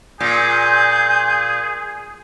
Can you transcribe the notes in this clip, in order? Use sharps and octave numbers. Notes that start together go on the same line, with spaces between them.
A#2 G#4 G6